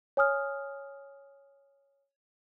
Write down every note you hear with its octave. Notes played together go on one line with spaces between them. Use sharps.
C#5 G#5 D#6 F6